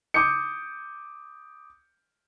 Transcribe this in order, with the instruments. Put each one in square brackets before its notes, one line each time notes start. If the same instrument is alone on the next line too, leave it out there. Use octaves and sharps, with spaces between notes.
[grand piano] D6 D#6 G6 C#7